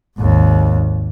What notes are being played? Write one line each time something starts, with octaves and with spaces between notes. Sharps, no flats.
G#1 D#2